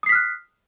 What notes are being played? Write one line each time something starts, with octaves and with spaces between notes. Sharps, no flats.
D#6 F6 F#6 B6 C7